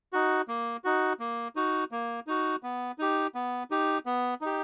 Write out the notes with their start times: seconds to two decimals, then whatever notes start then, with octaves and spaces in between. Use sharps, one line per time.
0.13 D#4 F#4
0.48 A#3
0.84 D#4 F#4
1.20 A#3
1.56 D#4 F#4
1.91 A#3
2.27 D#4 F#4
2.63 B3
2.98 D#4 G4
3.35 B3
3.71 D#4 G4
4.06 B3
4.41 D#4 G4